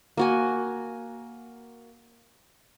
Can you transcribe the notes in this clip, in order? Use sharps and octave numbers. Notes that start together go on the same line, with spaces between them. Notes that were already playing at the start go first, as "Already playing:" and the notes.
A#3 F#4 G#5